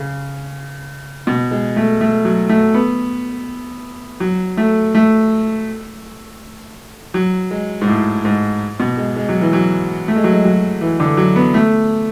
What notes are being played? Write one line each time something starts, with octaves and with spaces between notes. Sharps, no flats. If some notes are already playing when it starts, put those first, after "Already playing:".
Already playing: C#3
B2
G#3
A3
A3
F#3
A3
B3
F#3
A3
A3
F#3
G#3
G#2
A2
G#2
B2
G#3
G#3
F#3
E3
F#3
A3
G#3
F#3
G#3
F#3
E3
D3
F#3
B3
A3